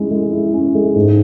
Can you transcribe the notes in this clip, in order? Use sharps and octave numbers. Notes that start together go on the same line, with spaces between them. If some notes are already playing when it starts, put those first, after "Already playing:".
Already playing: G#3 C#4 E4
G#3
E4
C#4
G#3
G#2